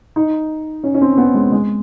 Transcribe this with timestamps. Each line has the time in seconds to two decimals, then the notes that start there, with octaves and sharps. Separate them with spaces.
0.16 D#4
0.84 C#4
0.94 C#4
1.02 C4
1.17 B3
1.34 G#3
1.52 G#3